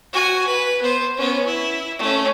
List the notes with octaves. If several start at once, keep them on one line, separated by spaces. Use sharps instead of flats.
F#4 G#5
B4
B3 C5
B3 C#4
E4
A3 C#4